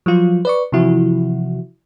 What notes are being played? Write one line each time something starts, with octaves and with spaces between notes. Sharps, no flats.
F3 F#3 F4
B4 D5 C#6
C3 E3 F3 E4 F#4